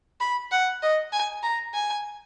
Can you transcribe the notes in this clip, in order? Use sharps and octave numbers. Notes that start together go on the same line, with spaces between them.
B5
F#5
D#5
G#5
A#5
G#5